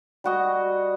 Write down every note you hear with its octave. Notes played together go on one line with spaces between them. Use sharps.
G3 F#4 D#5